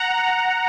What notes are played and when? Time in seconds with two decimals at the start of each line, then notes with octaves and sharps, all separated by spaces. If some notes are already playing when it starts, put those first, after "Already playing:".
Already playing: F#5 A#5